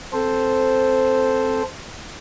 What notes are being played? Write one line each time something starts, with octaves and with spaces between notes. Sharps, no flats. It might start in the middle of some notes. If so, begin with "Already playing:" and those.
C4 A4 C5